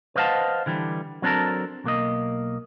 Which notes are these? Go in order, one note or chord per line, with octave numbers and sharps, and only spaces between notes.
B4 C5 D#5 F5 F#5 A5
D3 E3 G3
F#3 C4 D4 G4 A4 A#4
B1 A#3 D#5